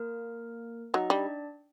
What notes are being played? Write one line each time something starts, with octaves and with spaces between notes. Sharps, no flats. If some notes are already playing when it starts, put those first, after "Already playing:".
Already playing: A#3 A#4
F#3 D#4 D#5
G3 D4 D5